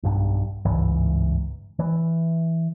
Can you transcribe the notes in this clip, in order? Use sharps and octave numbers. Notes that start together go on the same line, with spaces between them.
B1 G2
G1 C#2 G#2 E3
E3